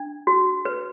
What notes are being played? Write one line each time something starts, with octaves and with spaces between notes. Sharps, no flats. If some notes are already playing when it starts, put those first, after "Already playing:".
Already playing: D4
F#4
B4